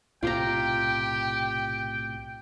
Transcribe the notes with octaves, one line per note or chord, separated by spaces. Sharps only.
B1 A2 C3 F4 G4 C5 G5 A#5